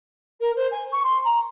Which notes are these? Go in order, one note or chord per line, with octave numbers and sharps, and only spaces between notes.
A#4
C5
G#5
C#6
C6
A#5